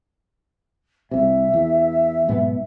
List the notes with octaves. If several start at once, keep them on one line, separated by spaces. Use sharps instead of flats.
C2 C3 E5
E2
B1 G#2 B3